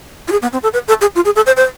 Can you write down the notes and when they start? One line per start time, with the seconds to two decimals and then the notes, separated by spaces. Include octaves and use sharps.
0.28 F4
0.32 G#4
0.42 B3
0.53 C4
0.63 A4
0.73 B4
0.88 A4
1.01 G#4
1.15 F4
1.25 G#4
1.36 A4
1.46 C5
1.57 C5